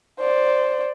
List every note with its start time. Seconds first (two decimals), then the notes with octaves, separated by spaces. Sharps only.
0.19 C5 D5